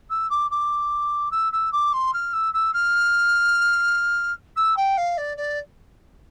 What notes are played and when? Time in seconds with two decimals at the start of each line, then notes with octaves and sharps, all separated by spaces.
0.10 E6
0.29 D6
0.50 D6
1.31 E6
1.52 E6
1.72 D6
1.92 C6
2.13 F6
2.33 E6
2.53 E6
2.73 F6
4.56 E6
4.76 G5
4.97 F5
5.17 D5
5.37 D5